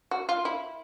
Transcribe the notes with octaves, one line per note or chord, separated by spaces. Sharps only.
F#4
F4
E4